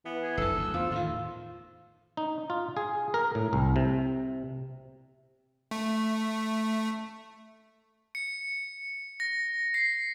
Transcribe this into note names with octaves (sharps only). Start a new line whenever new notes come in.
E3 B3
G#4
F#1 F2 D3 A4 E6
D2
E2 F3 F4
A2 D#3 F4
D#4
F4
G#4
A#4
A2
C2
C3
A3
C#7
A#6
C7